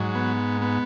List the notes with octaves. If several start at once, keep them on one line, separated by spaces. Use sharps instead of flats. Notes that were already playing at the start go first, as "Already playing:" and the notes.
Already playing: G#2 F#3
B3
B3